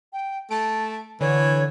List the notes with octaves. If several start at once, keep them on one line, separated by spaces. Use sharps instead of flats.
G5
A3 A5 D7
D3 E3 C#5